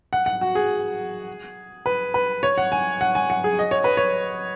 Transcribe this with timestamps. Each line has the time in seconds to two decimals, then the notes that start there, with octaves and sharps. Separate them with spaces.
0.13 F#5
0.26 F#5
0.41 F#4
0.55 G#4
1.86 B4
2.14 B4
2.43 C#5
2.58 F#5
2.72 G#5
3.01 F#5
3.15 G#5
3.30 F#5
3.44 G#4
3.59 D#5
3.71 C#5
3.84 B4
3.97 C#5